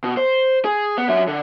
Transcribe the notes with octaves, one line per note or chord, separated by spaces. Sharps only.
B2
C5
G#4
B3
F#3 E5
D3